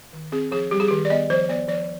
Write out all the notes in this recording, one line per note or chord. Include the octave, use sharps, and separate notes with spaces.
D#3
C4 G#4
F3 G#4
G3 G4
G#4
D#3 G4
D5
B3 D#5
F3 C5
B3 D5
F3 D5